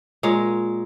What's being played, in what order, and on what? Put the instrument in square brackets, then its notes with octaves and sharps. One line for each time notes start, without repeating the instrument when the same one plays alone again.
[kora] A#2 G#3 C#5